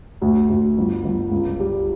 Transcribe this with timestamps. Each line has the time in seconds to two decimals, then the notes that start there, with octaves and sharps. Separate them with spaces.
0.22 D2
0.49 D2
0.77 G1
1.04 G1
1.31 C#2
1.59 G3